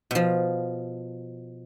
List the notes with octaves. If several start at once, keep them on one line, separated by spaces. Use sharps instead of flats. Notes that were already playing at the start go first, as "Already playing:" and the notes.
B2 F3